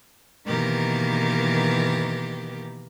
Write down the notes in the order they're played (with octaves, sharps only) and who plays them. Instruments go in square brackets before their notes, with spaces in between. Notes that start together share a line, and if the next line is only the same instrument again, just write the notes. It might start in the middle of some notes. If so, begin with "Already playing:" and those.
[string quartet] B2 D#3 E3 A#3 G4 A#4